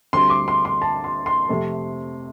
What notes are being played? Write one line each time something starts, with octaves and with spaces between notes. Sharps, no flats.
D2 D3 G3 C4 C6
D6
C6
C6
A5
C6
C6
F2 C3 A3 C4